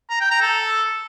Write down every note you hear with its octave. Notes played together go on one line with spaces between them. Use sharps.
A#5
G5
A#5
A4